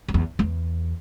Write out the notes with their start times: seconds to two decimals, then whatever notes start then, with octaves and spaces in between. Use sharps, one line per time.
0.08 F2
0.14 E2
0.39 E2